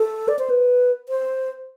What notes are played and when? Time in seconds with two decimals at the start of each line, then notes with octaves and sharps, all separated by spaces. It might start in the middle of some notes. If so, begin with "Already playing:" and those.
Already playing: A4
0.28 D5
0.39 C5
0.50 B4
1.09 C5